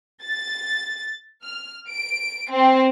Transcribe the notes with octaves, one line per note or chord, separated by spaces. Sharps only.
A6
F6
D7
C4